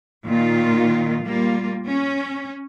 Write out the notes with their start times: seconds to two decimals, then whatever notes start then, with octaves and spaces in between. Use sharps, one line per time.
0.24 A#2 D#3 A#3 F4
1.25 G3 A#3 F4
1.87 C#4